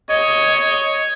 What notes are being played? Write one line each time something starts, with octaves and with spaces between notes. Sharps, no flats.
C#5 D#5